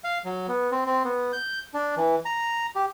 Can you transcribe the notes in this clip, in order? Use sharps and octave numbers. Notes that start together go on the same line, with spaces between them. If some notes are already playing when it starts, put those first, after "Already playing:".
F5
F#3
B3
C4
C4
B3
G6
D4
E3
A#5
G4